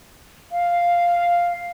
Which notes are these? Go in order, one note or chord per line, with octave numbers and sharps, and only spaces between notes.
F5